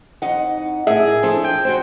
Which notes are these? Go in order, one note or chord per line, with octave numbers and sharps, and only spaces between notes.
F2 D#4 F#5
A2 G#4 A#4 E5
F3 D4 A4
G5
F#4 G#4 C5